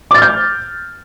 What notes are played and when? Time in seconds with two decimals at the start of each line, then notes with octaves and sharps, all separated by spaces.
0.11 D6
0.14 A6
0.18 F6
0.22 G6